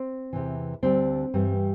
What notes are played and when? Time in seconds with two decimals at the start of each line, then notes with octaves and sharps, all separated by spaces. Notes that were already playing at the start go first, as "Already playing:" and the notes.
Already playing: C4
0.33 E2 C3 E3
0.83 D2 D3 G3 C4
1.34 G2 E3 G3